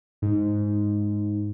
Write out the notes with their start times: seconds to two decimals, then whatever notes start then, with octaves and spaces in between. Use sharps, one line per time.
0.22 G#2